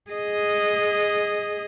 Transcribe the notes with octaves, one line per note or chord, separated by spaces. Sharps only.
G#4 D#5